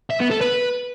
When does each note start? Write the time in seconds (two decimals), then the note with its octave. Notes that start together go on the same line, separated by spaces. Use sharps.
0.11 E5
0.21 B3
0.31 A4
0.41 B4